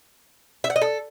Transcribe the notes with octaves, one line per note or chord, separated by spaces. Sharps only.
E5
F#5
D#5
A4